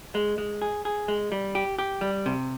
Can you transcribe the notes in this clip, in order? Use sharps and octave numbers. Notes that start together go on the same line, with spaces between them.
G#3
G#3
G#4
G#4
G#3
G3
G4
G4
G3
C3